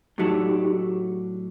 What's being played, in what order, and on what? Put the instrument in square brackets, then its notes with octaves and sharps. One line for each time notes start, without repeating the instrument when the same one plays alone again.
[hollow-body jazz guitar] A2 F#3 A3 D4 [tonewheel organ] D#4 G4